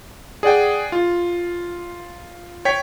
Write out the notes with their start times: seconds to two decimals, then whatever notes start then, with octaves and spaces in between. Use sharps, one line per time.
0.43 G#4 D5 F#5 G5
0.92 F4
2.65 C#5 G5 B6